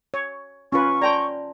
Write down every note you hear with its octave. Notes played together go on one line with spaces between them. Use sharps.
C#5
C#4 F4 B4 C#6
D5 G5 A5 A#5 C6